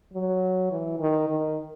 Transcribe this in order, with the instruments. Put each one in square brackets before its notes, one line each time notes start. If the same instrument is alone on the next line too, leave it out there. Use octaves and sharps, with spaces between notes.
[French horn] F#3
E3
D#3
D#3